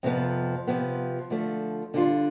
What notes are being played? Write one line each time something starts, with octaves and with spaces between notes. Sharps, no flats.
F2 C3 F3 B3
C3 F3 B3
D3 F3 A3
D3 G3 D4 F4